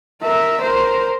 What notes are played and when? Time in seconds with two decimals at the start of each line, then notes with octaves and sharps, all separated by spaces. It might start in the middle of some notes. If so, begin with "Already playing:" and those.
0.22 A#4 E5
0.61 A#4 C5